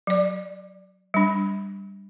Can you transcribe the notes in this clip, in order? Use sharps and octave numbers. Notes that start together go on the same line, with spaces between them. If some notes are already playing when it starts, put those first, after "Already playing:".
F#3 D5
G3 D4